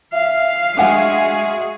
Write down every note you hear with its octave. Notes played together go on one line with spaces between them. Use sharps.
E5 F5
G#3 D4 F#4 G#4 F#5 G#5